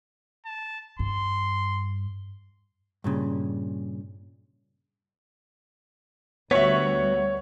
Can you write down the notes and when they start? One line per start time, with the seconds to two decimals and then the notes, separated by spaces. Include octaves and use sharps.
0.46 A5
0.99 G2 C6
3.04 G2 A#2 C#3
6.51 D2 G3 B3 F#4 C#5 E5 C#6 B6